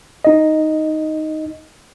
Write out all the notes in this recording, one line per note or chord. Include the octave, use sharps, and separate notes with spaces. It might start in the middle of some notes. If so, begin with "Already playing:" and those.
D#4 D#5